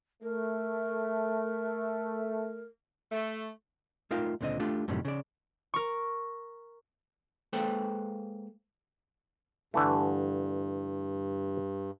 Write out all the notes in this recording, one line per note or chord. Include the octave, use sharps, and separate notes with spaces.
A3 A#4
A3
A3 D#4 F4 A#4 F5 G5
C#2 A#2 D3 C4 D#5
A3 D4 F4 G4
F#2 A2 C3 D#3 G3
C#3 D5
A#4 C#6
G#3 A#3 A4 B4 C5 G5
G2 D3 E3 A3